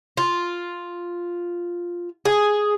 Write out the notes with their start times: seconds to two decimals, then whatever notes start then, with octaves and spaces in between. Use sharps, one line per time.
0.17 F4
2.25 G#4